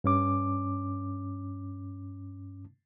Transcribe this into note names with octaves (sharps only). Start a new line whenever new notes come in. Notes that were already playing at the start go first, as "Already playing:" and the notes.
G2 C#4 D6